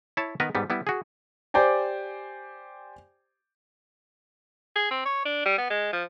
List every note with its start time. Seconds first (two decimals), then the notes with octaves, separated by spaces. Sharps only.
0.17 E4 C#5 A5
0.40 D#3 B3 A#4 B4 D#5
0.55 G#2 G3 B3
0.70 G3 B3 E4
0.87 F#4 G#4
1.54 G4 C5 D5 G5 G#5
4.75 G#4
4.91 C4
5.05 C#5
5.25 D4
5.45 G3
5.58 B3
5.70 G#3
5.93 F3